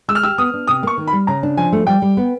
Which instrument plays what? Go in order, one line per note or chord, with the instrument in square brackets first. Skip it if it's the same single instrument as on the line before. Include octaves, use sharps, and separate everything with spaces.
[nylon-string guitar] G#3 [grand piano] E6
[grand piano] F6
[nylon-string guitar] G4 [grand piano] E6
[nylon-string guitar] B3 [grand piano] D#6
[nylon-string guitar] D4
[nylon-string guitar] C3 [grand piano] D#6
[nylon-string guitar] A#3 [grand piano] C#6
[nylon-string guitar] D#3
[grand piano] B5
[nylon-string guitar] G3
[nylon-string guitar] C#3 [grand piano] A#5
[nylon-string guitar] D4
[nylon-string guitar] F3 [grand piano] G#5
[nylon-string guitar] A3
[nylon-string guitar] G3 [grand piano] G5
[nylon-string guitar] G3
B3